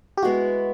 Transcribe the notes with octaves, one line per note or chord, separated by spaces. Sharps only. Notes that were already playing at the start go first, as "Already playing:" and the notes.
G4
G#3 B3 E4 F#4